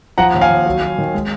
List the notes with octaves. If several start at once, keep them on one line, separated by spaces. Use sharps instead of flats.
F3 F#5 A#5
D#2
F5 G#5
D#2
F#3
F#3
D#3
G#3